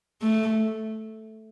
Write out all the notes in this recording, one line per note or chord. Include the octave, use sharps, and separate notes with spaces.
A3